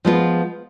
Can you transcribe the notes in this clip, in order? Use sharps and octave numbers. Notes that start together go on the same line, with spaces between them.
F3 G#3 B3 F4